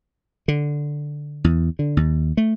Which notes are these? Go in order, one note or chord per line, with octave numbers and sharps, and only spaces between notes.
D3
E2
D3
D#2
A3